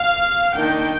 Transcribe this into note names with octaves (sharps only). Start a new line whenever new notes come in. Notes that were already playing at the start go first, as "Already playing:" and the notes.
Already playing: F5
D#3 A#3 D4 G5